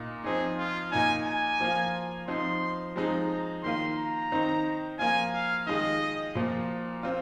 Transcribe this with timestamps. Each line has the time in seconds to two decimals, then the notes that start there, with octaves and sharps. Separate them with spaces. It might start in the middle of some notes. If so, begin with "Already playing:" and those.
Already playing: A#2 A#3 D#4
0.24 F3 C4 D#4 G#4
0.58 F4
0.92 A#2 A#3 D#4 G#5
1.26 G#5
1.60 F3 A#3 F4
2.28 F3 C4 D#4 C6
2.96 F3 G#3 C4 D#4 A#5
3.63 D#3 A#3 F4 C6
3.98 A#5
4.32 D#3 C4 D#4
4.99 F3 A#3 F4 G#5
5.33 F5
5.67 D#3 G#3 F4 D#5
6.35 A#2 F3 A#3 F4
7.03 C4 F4